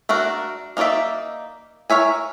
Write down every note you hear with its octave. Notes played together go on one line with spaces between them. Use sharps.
A3 D4 F#4 A#4
A#3 D#4 C#5 D5 E5
A#4 C#5 E5 G#5